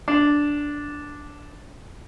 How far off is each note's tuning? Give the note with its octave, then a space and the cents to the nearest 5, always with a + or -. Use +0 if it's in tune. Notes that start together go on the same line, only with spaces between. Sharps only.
D4 -5